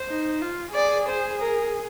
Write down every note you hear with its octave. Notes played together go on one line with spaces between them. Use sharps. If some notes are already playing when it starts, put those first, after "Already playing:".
Already playing: C5
D#4
F4
G#4 D5
C5
A#4